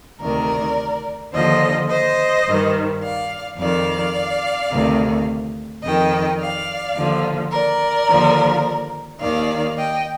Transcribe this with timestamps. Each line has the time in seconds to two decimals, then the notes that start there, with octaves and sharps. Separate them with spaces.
0.20 D2 C3 D#3 A#4 D5
1.33 D#2 D3 F3 C5 D#5
1.89 C5 D#5
2.46 G2 D#3
3.02 D5 F5
3.58 F2 D#3 D5 F5
4.71 D2 C3 D#3
5.83 F2 D#3 D#5 G5
6.39 D5 F5
6.96 D#2 D3 F3
7.52 A#4 D5
8.09 D#2 D3 F3
9.21 D#2 D#3 D5 F5
9.78 D#5 G5